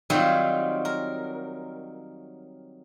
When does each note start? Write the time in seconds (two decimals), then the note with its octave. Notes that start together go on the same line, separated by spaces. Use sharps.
0.10 D#3 F#3 G3 C4 F4
0.85 A#4